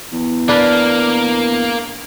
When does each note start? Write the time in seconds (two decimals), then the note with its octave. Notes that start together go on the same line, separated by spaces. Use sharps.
0.13 E2
0.48 A#3 D4 A#4 B4